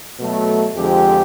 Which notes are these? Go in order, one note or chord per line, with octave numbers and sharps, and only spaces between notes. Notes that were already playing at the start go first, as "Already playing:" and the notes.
B2 F#3 A3
F2 D3 F3 G#3 G4